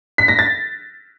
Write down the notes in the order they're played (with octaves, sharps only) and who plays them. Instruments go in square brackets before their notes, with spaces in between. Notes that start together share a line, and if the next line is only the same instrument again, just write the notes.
[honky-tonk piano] B6
A#6
A6